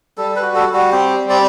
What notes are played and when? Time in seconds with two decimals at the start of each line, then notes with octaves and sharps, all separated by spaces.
0.17 G3 A4
0.36 B4
0.42 F#4
0.55 A4
0.67 G3
0.74 F#4
0.92 C4 G4
1.17 G3
1.30 D5